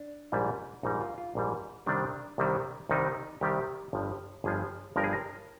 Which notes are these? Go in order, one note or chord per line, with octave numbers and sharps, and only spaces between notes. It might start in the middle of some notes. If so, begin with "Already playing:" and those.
Already playing: D4
A#1 G#2 G3
A#1 G#2 G3 D#4
F4
F4
A#1 G#2 G3
C2 C3 D#3 G3 D4
C2 C3 D#3 G3
C2 C3 D#3 G3 D#4
C2 C3 D#3 G3 G4
G1 G2 F3
G1 G2 F3 G#4
G1 G2 F3 A#4
G#4
A#4